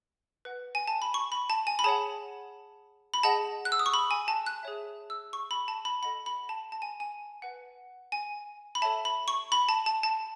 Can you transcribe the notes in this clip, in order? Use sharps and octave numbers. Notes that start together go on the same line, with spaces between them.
B4 F#5
G#5
A5
B5
C#6
B5
A5
G#5
B5
G#4 C#5 F#5 A5
B5
G#4 D#5 F#5 A5
F#6
E6
D#6
C#6
B5
G#5
A5
F#6
G#4 C#5 E5
E6
C#6
B5
A5
B5
A4 D#5 F#5 B5
B5
A5
A5
G#5
G#5
B4 F#5
G#5
B5
A4 C#5 E5 A5
B5
C#6
B5
A5
A5
A5